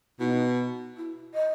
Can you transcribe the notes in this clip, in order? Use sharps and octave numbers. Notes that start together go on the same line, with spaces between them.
B2 D#4 E4
E4
D#5